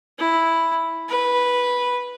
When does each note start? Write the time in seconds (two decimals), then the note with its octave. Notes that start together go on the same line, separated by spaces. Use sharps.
0.19 E4
1.09 B4